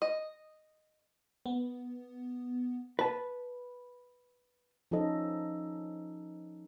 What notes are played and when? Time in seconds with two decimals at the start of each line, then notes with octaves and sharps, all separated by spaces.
0.02 D#5
1.46 B3
2.99 B4 A5
4.91 F3 C#4 D#4 A4 D#5